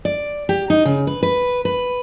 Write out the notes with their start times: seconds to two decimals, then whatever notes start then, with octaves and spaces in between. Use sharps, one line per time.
0.05 D5
0.49 G4
0.70 D#4
0.85 C#3
1.07 B4
1.23 B4
1.65 B4